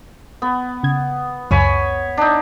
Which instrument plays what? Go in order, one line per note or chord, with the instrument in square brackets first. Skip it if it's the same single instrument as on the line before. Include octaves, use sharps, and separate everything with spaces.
[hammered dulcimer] B3
[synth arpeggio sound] C#3 G#6
[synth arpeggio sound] C#2 F#2 [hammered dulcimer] C#5 G#5 B5
[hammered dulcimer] D4 D#4